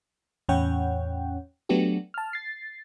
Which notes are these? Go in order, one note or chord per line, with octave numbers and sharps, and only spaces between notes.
E2 A2 C#4 C#5 F#5 G5
F#3 A3 B3 D4 F#4 G4
A5 F6
A6 C7